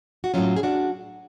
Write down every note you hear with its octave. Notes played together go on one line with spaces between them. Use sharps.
F#4
A2 F#3 C#4 F4
G#4
D4 F#4